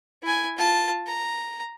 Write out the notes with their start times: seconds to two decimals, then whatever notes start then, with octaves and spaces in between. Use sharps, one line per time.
0.23 E4 G#5
0.57 F4 A5
1.07 A#5